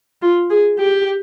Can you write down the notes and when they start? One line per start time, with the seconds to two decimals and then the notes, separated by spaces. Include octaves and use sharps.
0.22 F4
0.50 G#4
0.79 G4